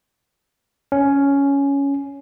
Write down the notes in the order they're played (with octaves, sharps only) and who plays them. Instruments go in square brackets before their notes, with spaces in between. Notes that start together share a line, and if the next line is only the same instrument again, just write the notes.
[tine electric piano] C#4